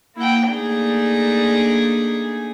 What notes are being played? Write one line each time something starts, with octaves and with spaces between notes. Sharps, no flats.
A#3 E4 F#5 G5
A3 A#3 D4 D#4 G#4